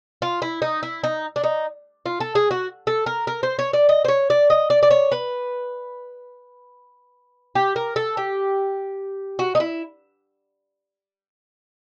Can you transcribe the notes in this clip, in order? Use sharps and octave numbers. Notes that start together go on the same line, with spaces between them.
F4
E4
D#4
E4
D#4
D4
D#4
F4
A4
G#4
F#4
A4
A#4
A#4
C5
C#5
D5
D#5
C5
C#5
D5
D#5
D5
D5
C#5
B4
G4
A#4
A4
G4
F#4
D#4
E4